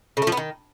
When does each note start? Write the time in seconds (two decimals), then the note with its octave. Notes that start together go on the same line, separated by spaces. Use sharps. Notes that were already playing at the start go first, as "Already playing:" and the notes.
0.17 C#3
0.22 A3
0.27 F3
0.32 B3
0.37 D#3